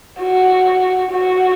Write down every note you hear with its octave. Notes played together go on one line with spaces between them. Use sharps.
F#4
F#4